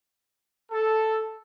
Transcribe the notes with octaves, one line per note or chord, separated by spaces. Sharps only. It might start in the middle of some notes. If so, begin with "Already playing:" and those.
A4